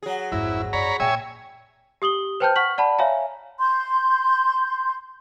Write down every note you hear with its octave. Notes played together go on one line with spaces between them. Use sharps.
F#3 G#4
G#1 F2 E4
F#2 C#5 D5 A#5 B5
A#2 C#5 E5 G5 G#5
G4 D#6 F#7 G7
B4 C5 G5 A5 F6 G6
F#5 C#6 F6 B6 F#7
D5 F#5 A5 B5
C#5 E5 F5 G#5 A#5
C6 G6